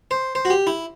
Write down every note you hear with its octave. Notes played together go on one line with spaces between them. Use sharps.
C5
C5
F#4
G4
E4